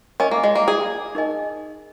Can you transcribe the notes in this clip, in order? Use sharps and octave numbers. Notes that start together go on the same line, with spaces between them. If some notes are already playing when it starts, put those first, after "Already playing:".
C#4 A#4 D#5 G#5
A#3
G#3
A#3
G#4
D#4 A#4 D#5 G#5